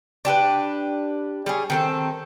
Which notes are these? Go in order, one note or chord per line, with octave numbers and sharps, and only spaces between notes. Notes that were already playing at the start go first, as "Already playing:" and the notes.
D4 G4 A4 B4
G3 C#4 G#4
D#3 C4 A4